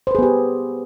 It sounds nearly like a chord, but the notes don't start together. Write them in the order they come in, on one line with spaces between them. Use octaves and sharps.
C5 B4 G#4 B3 G4